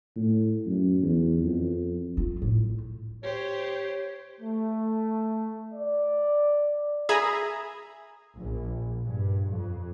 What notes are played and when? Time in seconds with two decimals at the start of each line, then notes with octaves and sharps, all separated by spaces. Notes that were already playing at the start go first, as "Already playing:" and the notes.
0.16 A2
0.66 F#2
1.03 E2
1.44 F2
2.17 F4
2.42 A2
3.23 G4 C5 C#5
4.40 A3
5.72 D5
7.09 G#4 E5 A#5 B5 D#6 G#6
8.35 A#1
9.06 G2
9.51 F2